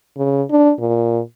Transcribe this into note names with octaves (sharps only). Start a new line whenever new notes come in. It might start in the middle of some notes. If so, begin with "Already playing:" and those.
C#3
D4
A#2